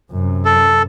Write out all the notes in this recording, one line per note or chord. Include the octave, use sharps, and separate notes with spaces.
F#2 C3
A4